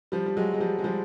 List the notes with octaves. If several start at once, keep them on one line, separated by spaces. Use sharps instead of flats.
F3 G3
G3
F#3 G#3
G#3
F3 G3
G#3
F3 G3